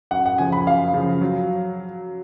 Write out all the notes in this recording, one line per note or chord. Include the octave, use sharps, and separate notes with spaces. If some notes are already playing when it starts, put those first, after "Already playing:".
F#2 F#5
F#5
C#3 F3 G#5
B5
F#2 F5
C#3 F3
F#3